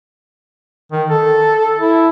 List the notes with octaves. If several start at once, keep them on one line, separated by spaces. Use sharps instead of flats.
D#3
A4
E4